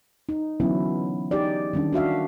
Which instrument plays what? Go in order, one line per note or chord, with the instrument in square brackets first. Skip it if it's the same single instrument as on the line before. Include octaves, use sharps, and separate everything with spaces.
[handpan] D#4
D3 E3 F#3 B3 C#4 E4
D#4 G4 G#4 D5
D#3 G3 C#4 D4
D4 F#4 E5 F5